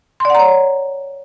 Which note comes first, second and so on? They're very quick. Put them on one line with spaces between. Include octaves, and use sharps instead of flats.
C6 D5 F#5 A#5 C#5